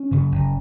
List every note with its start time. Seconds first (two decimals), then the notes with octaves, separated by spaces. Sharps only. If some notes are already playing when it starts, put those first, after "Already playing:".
Already playing: C#4
0.11 F#2 C#3
0.32 F#1